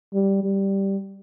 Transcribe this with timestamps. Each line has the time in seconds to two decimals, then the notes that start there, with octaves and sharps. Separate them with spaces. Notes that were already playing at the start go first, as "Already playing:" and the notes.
0.14 G3
0.44 G3